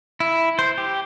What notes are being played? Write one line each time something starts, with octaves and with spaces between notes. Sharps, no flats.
E4
C5
G4